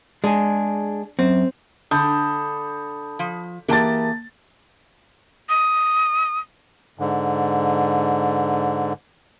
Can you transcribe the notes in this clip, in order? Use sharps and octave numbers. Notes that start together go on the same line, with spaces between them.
G#3 D4 G#4
F#2 C4
D3 A5 B5 D#6 G6
F3
E3 A#3 G4 G#4 A5 A6
D#6
G#2 D3